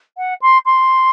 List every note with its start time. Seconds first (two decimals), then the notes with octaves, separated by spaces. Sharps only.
0.17 F#5
0.41 C6
0.65 C6